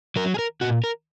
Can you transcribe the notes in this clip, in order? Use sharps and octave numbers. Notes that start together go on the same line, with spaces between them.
F#3 A#4
G#4
A#4
A#2 F#4
A#4